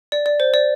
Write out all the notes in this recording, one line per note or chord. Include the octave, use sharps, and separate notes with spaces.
D5
D5
C5
D5